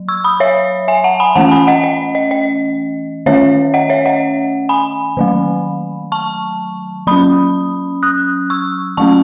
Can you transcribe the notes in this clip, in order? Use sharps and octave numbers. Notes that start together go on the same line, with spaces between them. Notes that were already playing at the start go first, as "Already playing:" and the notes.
Already playing: F#3
C#6 E6
B5 D#6
C#5 E5
E5 G#5
F#5 A5
G#5 B5
E3 A3 C#4 F#5 A5
G#5 B5
D#5 F#5
D#5
D#5
D#5
D#3 A3 C#4 C#5 E5
D#5 F#5
C#5 E5
D#5 F#5
G#5 B5
D#3 F#3 A3
A5 C#6
F#3 C#4 B5 D#6
D#6 F#6
C#6 E6
F#3 A3 C#4 A5 C#6